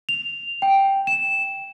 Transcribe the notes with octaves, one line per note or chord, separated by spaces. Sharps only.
F7
G5
E7